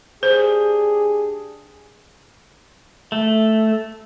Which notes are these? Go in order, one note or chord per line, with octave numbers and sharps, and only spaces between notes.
D4 G4 G#4 C5
A3